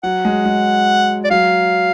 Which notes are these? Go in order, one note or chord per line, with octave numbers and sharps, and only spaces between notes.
F#3 F#5
G#3
G#3
D5
F#3 F5